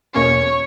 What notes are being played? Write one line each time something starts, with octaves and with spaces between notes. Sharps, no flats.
E2 B2 A#3 C#4 C#5